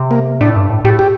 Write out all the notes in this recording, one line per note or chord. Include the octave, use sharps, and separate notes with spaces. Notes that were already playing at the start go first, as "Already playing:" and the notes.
Already playing: C3
A#3
A2 D4
G2
A2
A2 G4
G4